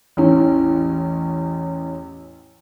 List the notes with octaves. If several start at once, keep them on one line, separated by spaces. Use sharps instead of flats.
A1 E2 C#4